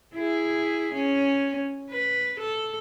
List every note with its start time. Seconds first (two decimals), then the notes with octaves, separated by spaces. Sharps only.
0.15 E4 G#4
0.95 C#4
1.90 B4
2.40 A4